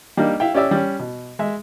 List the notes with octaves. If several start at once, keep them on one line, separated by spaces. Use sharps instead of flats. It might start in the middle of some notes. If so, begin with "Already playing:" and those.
G3 A#3 D4 D#4
E4 E5 F5 G5
C#4 G4 D5 E5 E6
G3 C#4
B2
G#3 E5